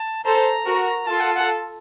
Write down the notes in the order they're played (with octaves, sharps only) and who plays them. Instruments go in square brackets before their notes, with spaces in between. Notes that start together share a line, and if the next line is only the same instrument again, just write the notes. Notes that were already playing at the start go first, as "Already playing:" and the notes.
Already playing: [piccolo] A5
[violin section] A4 C5 [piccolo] A#5
[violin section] F#4 A#4
[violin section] F4 A4 [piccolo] A5
[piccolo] F#5
F#5